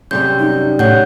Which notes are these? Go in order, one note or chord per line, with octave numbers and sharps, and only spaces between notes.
F#2 C3 G3 G6
D#4
A2 C#5 F#5 G6